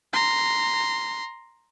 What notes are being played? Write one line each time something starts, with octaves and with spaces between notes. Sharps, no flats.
A#5 C6